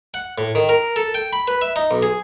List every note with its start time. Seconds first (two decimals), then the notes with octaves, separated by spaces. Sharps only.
0.14 F#5
0.38 A2
0.55 D#3
0.69 A#4
0.96 A4
1.14 G5
1.33 B5
1.48 B4
1.62 E5
1.76 D#4
1.91 B1
2.03 G#4